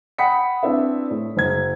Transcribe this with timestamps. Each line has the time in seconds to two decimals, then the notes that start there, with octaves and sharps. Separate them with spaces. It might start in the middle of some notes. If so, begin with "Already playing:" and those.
0.18 F#5 G5 B5 D#6 B6 C#7
0.63 C4 D4 E4 B4 E5
1.11 A2
1.37 F#1 G#6